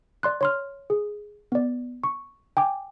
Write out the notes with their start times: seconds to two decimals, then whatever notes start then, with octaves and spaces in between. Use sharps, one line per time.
0.23 D5 C6 F#6
0.41 C#5 C6 F6
0.90 G#4
1.52 B3 D5
2.04 C#6
2.57 G5 G#5 D6